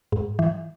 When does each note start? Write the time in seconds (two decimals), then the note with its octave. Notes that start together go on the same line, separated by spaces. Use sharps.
0.12 G#2
0.39 E3